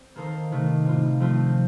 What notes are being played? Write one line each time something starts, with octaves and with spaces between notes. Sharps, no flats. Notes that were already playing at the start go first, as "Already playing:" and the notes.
Already playing: C4
D#3 A#3 D#4 A4 C5
C3 D#3 A3
A2 G3 C4 F4
F3 A3 C4 F4